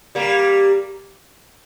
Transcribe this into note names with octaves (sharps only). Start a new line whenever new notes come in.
G3 A#3